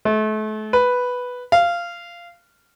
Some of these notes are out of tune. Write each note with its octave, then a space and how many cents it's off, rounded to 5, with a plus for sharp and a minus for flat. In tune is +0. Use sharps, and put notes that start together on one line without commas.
A3 -35
B4 +0
F5 -15